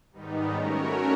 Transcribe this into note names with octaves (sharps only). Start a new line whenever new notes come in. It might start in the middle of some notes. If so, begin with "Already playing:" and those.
G#2 D#3 G3 B3 D#4
A3 C#4 F#4 A#4 C#5